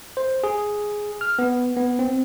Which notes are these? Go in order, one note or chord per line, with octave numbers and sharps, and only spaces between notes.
C5
G#4
F6
B3
B3
C4